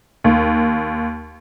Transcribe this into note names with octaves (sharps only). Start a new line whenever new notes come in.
D#2